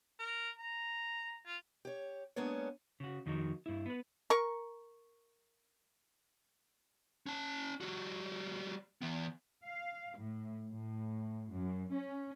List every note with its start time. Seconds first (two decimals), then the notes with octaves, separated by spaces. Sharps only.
0.19 A#4
0.58 A#5
1.46 F4
1.85 G4 C#5
2.36 G#3 A#3 B3 C#4 D4 C#5
3.00 C#3 F#4
3.26 F2 D#3 D#4 F#4 A#4
3.66 G2 E4
3.86 B3 B4
4.30 A#4 C#6
7.26 C#4 A5
7.81 G3 F#4
9.02 E3 B3
9.65 F5
10.18 A2
10.72 A2
11.52 F#2
11.92 C#4